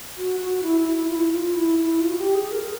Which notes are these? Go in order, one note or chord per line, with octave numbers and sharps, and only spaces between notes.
F#4
F#4
E4
E4
E4
F4
E4
F4
E4
E4
F4
F#4
G4
G#4
A#4